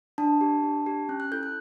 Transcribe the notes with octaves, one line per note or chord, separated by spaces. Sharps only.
D4 A5
G4
D4
G4
C#4 F#6
F#6
E4 A4 G6
F#6